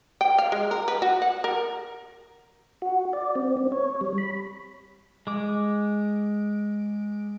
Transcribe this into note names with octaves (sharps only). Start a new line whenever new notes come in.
G5
F5
G#3
A#4
B4
F#4
F#5
A#4
F#4
D5
C4
C4
C#5
G3
B5
G#3 D6